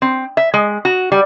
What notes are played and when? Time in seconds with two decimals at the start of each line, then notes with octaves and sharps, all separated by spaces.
0.02 C4
0.37 E5
0.54 G#3
0.85 F#4
1.12 G3